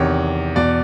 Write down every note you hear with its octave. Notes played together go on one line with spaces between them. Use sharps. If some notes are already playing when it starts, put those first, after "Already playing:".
Already playing: E2 C3 D#3 C#5
E2 B2 D5